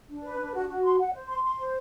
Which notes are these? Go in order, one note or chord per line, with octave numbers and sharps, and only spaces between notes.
D4
B4
D4
F#4
F#4
C6
F#5
C5
C6
C6
C5